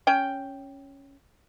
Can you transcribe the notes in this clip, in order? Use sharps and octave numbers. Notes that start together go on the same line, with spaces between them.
C#4 G5